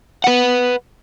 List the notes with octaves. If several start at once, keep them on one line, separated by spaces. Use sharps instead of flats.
B4 F#5